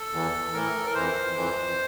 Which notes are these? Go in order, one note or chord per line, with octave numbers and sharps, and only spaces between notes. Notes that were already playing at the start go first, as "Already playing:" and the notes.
Already playing: A4
E2 E3
A2 E3 A#4
A4
A#4
F2 E3 C5
F2 E3